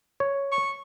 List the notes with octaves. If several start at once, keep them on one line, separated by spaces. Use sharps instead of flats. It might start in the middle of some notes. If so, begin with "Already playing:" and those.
C#5
C#6